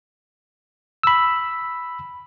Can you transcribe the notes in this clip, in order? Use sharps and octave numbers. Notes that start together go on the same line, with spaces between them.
B5 E6